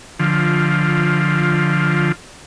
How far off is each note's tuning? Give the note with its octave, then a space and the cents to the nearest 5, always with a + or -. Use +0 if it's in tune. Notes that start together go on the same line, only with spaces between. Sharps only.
D3 +0 F3 +10 F4 +0